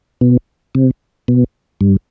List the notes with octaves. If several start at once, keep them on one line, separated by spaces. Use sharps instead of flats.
B2
C3
B2
G2